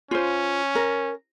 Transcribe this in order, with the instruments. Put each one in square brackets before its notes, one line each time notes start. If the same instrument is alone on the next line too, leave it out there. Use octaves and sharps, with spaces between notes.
[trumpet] C#4 [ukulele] F4 C5
[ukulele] A#4